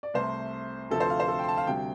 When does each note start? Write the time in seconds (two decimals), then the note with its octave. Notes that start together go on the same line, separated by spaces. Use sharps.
0.03 D5
0.14 C2 C3 A3 C5
0.90 D2 C3 F3 A3 A4
1.00 C5
1.10 F5
1.20 C5
1.28 A4
1.39 G5 C6
1.48 A5
1.57 F5
1.67 D2 C3 G3 G5